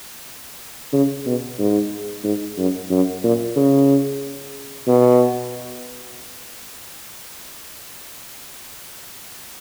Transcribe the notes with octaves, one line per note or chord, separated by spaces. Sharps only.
C#3
B2
G#2
G#2
F#2
F#2
A#2
C#3
B2